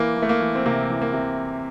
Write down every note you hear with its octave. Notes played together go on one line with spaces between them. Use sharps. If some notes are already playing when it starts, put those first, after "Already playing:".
Already playing: E3 A#3
E3
A3
A#3
E3
C4
C3 A#3
E3
A#3
C3